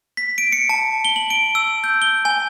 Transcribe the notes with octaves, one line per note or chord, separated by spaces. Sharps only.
B6
D7
C#7
A5
G7
F#7
D7
E6
G6
G7
G#5